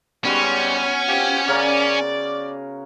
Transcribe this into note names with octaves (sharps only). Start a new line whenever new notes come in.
G#2 G3 B3 C#4 F#4 C6
C4 F4 G4
C#3 A#4 D5